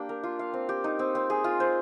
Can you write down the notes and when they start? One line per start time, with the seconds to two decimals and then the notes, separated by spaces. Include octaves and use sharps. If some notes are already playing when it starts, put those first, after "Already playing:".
Already playing: A#3 D4 G4
0.09 A#4
0.24 F4
0.39 F5
0.54 C4
0.69 G4
0.84 D#4
0.99 C4
1.15 C4
1.30 G#4
1.44 F4
1.60 C5